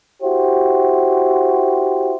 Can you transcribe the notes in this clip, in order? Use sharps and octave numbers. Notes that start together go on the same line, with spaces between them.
E4 F#4 G4 C5